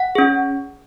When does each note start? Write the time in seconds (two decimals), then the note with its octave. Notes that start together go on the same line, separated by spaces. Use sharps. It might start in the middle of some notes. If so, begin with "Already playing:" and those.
Already playing: F#5
0.15 C#4 G#4